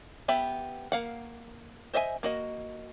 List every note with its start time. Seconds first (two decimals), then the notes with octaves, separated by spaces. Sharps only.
0.28 B3 G4 E5 B5
0.92 A#3 F5 F#5
1.94 C5 D#5 E5 F#5 G#5
2.23 A#3 F#4 D#5